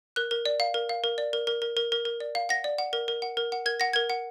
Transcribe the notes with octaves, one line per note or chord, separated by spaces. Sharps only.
A#4 F#6
A#4
D5
F5
A#4
F5
A#4
D5
A#4
A#4
A#4
A#4
A#4
A#4
D5
F5
F#5 A#6
D5
F#5
A#4
A#4
F#5
A#4
F#5
A#4 G#6
F#5 A#6
A#4 G#6
F#5